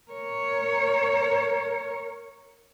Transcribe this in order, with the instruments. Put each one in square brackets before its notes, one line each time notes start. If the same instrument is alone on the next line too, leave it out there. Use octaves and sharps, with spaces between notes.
[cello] A#4 C#5